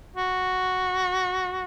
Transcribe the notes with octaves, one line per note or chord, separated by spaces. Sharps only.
F#4